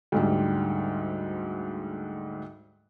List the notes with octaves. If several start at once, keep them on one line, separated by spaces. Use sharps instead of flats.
D2 G#2 G3